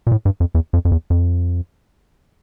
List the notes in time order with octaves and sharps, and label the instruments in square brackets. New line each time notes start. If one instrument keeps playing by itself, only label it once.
[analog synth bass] A#2
A2
G2
F2
E2
F2
F2
E2
F2